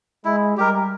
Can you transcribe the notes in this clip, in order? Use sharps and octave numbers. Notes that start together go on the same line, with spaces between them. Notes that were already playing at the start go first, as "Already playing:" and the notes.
G#3 E4
G3 G4 A#4